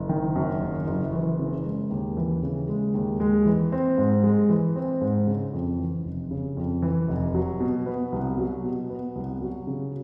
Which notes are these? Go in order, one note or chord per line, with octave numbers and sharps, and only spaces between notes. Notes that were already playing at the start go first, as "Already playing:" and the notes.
Already playing: F#1
D#3
F#2
F#1
F#1
E3
C#3
G#3
D#2
E3
C#3
G#3
D#2
G#3
E3
C4
G#2
G#3
E3
C4
G#2
C#3
F2
E3
F1
C#3
F2
E3
F1
F#3
B2
B3
C2
F#3
B2
B3
C2
F#3
C#3